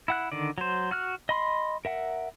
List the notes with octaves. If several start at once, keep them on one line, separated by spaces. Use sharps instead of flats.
E4 F#5 F#6
D3 D#3 D5
F#3 C5
F#4 F6 F#6
D#5 B5 C6
A#4 E5 F#5